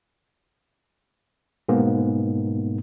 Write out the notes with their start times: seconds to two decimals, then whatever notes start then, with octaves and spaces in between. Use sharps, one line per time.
1.69 G#2 B2 A#3 B3